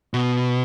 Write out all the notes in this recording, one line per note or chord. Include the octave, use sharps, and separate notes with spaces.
B2